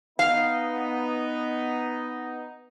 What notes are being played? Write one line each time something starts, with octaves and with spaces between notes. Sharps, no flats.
B3 D#4 F5